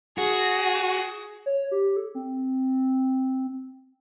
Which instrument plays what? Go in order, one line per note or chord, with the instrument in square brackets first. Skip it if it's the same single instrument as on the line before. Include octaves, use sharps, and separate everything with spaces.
[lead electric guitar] F#4 [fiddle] G#4
[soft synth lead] C#5
G4
A4
C4